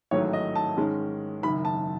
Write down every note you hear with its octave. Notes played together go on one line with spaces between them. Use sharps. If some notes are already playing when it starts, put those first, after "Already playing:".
A1 G#2 D#3 F#3 A3 C#5
D#5
A5
G#2 D#3 G#3 C#4
F#1 F#2 D#3 B5
A5